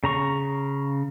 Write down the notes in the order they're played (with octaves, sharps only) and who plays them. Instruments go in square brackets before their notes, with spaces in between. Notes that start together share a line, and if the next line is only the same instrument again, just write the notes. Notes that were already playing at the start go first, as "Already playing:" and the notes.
[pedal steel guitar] C#3 A#5 C#6